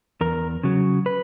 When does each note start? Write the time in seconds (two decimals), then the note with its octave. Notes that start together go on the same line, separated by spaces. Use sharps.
0.21 E2 A#4
0.63 C#3 F#3
1.06 B4